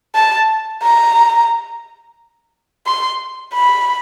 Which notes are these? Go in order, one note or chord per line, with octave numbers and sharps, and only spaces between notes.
A5
A#5
C6
B5